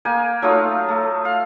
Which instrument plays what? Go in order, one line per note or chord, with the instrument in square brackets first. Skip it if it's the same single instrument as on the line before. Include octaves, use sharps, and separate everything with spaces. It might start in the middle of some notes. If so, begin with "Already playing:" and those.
[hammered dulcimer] A#3 G5 G#5
F#3 A3 D#4 F4
A3
F5